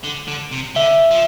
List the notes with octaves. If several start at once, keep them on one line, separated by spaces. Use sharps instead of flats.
D3
D3
C3
D3 E5
F3